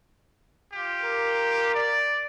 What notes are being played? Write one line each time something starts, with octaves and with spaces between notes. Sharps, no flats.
F4 G4
A#4
D5